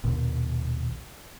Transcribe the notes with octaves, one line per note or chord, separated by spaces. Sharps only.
A#1 D#2 B2